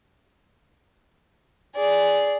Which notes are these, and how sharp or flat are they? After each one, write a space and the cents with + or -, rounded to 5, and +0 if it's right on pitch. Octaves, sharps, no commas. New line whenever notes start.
G#4 +0 D5 -10